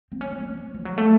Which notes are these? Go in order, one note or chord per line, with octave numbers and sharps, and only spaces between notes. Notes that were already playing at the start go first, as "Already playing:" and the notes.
C4
C#4
C4
C#4
C4
F3
F#3
A3